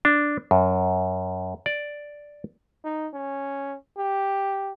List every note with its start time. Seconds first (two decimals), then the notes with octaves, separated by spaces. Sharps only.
0.05 D4
0.51 F#2
1.66 D5
2.84 D#4
3.13 C#4
3.98 G4